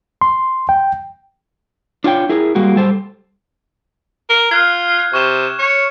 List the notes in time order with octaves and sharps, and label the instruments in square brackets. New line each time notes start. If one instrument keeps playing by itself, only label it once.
[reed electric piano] C6
G5
[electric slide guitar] D4 F4 C#5 G5
E4 G#4 A#4
G3 G#3 A#3 F#4
G3 A4 C5
[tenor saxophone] A#4
[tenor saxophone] F4 [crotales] F6 F#6 G#6
[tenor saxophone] C3 [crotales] C#6 E7
[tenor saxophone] C#5